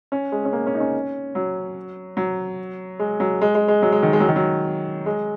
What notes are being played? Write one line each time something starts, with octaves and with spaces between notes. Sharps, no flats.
C#4
G#3
C#4
A#3
C#4
D#4
C#4
F#3
F#3
G#3
F#3
G#3
G#3
G#3
F#3
G#3
D#3
G#3
F#3
D#3
F#3
G#3